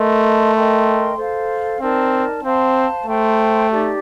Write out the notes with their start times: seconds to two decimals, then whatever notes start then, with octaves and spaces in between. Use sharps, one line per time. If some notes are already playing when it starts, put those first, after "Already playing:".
Already playing: A3 A#4 D#5 A5 C6
0.54 A#4 D#5 G5 C6
1.17 A4 C5 F5
1.80 C4 D#4 A#4 D5 A5
2.43 C4 C5 F5 A5 C6
3.06 A3 C5 G5 C6
3.70 D#4 G4 D5 A5